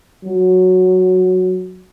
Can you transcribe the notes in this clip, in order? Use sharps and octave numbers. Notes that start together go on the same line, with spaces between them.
F#3